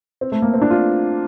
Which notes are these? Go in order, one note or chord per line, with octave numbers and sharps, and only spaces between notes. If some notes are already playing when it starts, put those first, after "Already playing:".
C4
A3
A#3
C4
D4
F4